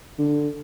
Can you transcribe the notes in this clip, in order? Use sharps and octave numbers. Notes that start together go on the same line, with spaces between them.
D3